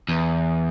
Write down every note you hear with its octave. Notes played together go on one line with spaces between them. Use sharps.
E2